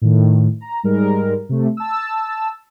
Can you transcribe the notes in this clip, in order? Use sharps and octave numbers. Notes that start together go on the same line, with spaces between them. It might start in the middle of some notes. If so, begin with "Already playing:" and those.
A2 D#3
A#5
G#2 G3 G#3 A#4
C3 A3
A5 E6